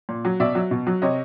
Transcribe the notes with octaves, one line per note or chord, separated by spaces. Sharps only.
A#2
F#3
B2 D5 E5
F#3
B2
F#3
C3 C#5 D#5